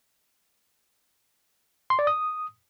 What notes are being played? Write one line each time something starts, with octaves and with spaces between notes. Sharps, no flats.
C6
D5
D#6